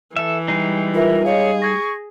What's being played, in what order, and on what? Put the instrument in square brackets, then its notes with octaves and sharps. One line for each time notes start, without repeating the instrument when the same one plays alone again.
[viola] E3 [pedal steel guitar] A4 E5
[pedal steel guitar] G3 G#3 D#4 [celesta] C7
[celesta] F4 B4 E5 [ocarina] A#4
[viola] G#4 [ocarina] C#5 [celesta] D#5 F5
[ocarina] C#6 [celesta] G#6 A#6